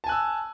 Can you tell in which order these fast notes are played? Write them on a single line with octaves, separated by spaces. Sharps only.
A5 G#5 F#6 E6